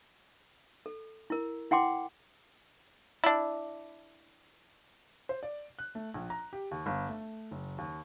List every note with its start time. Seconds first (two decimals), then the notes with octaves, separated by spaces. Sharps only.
0.86 A4
1.30 E4 A#4
1.71 E4 F#5 G5 C6 D6
3.24 D4 E4
5.29 C5
5.43 D5
5.79 F#6
5.95 A3
6.14 A#1
6.30 A#5
6.53 G4
6.71 D#2
6.86 G1
7.09 A3
7.51 F#1
7.78 D#2